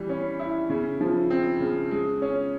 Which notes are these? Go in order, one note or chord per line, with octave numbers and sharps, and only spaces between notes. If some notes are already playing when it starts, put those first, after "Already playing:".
Already playing: E3 G3
C#4
E4
C#3
F3
C4
C#3
G#3
C#4